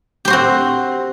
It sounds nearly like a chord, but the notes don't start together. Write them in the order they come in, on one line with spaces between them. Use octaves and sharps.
G4 C5 F#4 C4